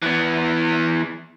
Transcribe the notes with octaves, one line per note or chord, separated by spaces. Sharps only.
E3 B3